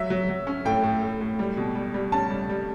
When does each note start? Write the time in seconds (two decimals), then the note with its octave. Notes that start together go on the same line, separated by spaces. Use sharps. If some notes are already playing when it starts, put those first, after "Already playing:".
Already playing: F#3 E5
0.10 F#3
0.29 F#3
0.47 C#4
0.65 A2 G5
0.84 A2
1.03 A2
1.21 A2
1.39 G3
1.57 B2
1.75 G3
1.94 G3
2.12 C#4 A5
2.30 G3
2.50 G3